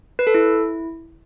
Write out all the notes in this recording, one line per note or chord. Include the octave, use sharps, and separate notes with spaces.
B4
A4
E4